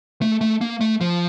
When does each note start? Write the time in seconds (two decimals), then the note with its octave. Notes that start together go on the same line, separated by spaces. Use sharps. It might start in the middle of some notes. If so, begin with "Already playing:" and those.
0.22 A3
0.41 A3
0.61 A#3
0.81 A3
1.01 F3